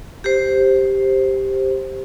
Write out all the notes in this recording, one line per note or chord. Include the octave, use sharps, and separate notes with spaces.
G4 C5